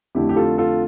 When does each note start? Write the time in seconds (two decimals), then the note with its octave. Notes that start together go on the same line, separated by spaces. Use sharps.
0.15 F2 D3 A3 E4 G4
0.29 G4
0.36 F4 A4
0.58 F4 A4